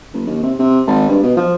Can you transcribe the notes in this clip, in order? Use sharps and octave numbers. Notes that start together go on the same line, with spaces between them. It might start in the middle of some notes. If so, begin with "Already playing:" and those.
F#1
D#2
C3
C3
G#1
G2
B2
F3